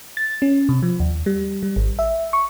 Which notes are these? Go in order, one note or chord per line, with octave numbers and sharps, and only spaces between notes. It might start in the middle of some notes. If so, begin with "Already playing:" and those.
A6
C#4
C3
F3
D#2
G3
G3
G#1
E5
C#6